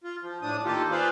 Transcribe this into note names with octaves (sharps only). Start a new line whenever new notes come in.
F4
F3
A2 D4 D#6
D#3 A#3 F4 G4 A4
F4 G#4 B4 C5 D5 F5